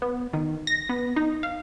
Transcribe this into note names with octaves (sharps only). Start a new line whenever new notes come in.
B3
D#3
A#6
B3
D#4
F5